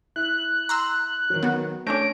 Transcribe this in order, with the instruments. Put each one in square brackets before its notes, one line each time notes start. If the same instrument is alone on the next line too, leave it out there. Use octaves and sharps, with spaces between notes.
[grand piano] E4 [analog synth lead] F#6
[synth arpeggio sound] A#5 C6 E6
[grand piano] D#3 F#3
[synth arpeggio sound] B3 F#4
[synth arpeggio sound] A3 C#4 D4 [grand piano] C#5 G6 A#6 [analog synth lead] D7